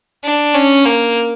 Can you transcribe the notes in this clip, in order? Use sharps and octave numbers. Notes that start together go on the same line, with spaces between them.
D4
C#4
A#3